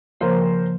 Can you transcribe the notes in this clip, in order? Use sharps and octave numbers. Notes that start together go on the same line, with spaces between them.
C#3 F3 A#3 A#4 C5